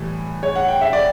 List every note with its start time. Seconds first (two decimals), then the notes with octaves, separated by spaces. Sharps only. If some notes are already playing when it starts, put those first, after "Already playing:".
Already playing: A2 E3 G3
0.43 C#5
0.55 F#5
0.68 G5
0.81 E5
0.93 D5